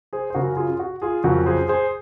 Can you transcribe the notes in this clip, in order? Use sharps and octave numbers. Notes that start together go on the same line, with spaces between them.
G#4 C5
C5
F#2 C#3 F#3 F#4 A#4
F4 G#4
F#4
F4 G#4
F2 C#3 F#3 F#4 A#4
G#4 C5
G#4 C5